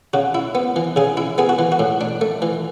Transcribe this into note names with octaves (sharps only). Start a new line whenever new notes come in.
C#3 F#4
E4
B3
E3
C#3 G#4
E4
B3 G#4
F#4
E3
F#4
A2
D4
A3
E3